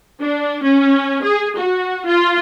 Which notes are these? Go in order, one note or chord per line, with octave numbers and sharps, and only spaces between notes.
D4
C#4
G#4
F#4
F4